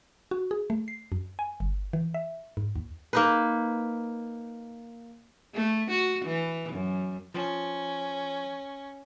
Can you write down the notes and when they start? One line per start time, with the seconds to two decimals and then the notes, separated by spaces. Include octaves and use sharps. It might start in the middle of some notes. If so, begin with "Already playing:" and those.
0.31 F#4
0.51 G#4
0.70 A3
0.88 C7
1.12 F#2
1.39 G#5
1.60 G1
1.93 E3
2.14 E5
2.57 G#2
2.76 D#2
3.13 A#3 D#4 B4
5.54 A3
5.91 F#4
6.25 E3
6.73 F#2
7.34 F3 C#4